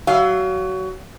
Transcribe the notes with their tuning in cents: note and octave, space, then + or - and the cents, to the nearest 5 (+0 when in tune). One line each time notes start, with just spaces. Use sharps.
F#3 +25 F5 +0